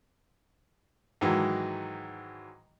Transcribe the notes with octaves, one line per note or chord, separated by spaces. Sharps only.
G#2 D#3 E3 F#3